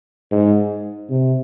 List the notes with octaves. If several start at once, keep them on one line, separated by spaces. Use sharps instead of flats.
G#2
C3